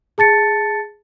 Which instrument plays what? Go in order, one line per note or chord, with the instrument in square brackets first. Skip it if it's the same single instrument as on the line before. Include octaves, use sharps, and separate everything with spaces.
[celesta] G#4 A5 A6 C#7